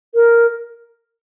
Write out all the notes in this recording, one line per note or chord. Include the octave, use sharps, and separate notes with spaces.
A#4